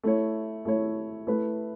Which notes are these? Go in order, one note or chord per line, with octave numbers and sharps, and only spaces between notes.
A3 E4 C#5
A3 E4 C#5
A3 E4 B4